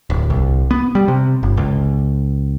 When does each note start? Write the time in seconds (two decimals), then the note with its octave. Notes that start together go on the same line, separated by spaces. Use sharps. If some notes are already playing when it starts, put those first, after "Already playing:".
0.10 D1
0.30 C2
0.71 B3
0.95 G3
1.08 C3
1.43 G1
1.57 C#2